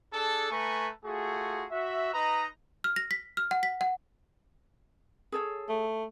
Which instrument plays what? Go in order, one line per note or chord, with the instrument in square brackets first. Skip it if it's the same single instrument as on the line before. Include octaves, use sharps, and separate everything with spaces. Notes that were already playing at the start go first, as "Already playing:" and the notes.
[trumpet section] D4 G#4 A4
A3 B4 G#5 A#5 C#6
A3 F4 F#4 G#4
F#4 E5
D#4 B4 D#5 A#5
[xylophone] F6
A#6
B6
F6
F#5
B6
F#5
[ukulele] G#4 A4 C#5
[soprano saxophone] A3